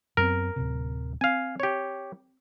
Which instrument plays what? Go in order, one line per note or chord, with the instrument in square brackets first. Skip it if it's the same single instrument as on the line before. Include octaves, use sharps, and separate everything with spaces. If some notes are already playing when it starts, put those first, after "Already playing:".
[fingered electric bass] F#2 B3 C4 [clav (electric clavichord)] A#4
[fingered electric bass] D1 G1 C3
[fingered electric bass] C4 [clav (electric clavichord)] F5 G#5
[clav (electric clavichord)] G4 C#5